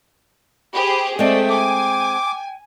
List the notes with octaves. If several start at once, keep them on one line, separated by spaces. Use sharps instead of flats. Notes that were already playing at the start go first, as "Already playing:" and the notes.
G4 G#4 C5 B5
G#3 A3 C4 D5 G5
G5 G#5 D6